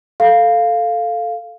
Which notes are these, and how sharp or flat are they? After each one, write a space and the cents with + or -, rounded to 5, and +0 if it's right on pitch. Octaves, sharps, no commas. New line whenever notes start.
A4 +0 F5 +0